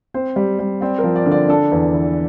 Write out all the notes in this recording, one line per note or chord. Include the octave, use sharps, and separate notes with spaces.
C4 C5
G3
G3
C4 D5
A#4
F3
D5
D3
D5
D4 A4
E2
E3